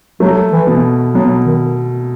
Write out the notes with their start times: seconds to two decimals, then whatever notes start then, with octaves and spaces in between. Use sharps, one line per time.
0.20 F#3 A3
0.52 E3
0.67 B2
1.14 B2 F#3
1.45 D#3